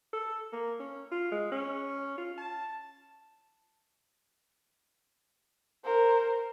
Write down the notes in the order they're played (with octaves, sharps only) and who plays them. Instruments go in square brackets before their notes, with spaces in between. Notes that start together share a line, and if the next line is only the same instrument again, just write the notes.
[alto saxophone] A4
A#3
C#4
F4
G#3
C#4
F4
A5
[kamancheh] A#4 C5